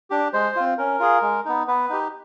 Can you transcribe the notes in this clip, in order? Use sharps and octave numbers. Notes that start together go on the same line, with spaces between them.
D4 G4
G#3 C5
C4 F4
C#4 A#4
F4 G#4
G#3
B3 D#4
B3 B4
D#4 G4